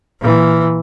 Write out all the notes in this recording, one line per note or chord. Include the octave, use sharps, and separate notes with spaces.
A#2 E3